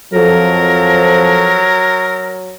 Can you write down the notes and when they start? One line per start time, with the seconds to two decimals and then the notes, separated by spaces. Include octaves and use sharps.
0.13 F2 F3 F#3 A4 A#4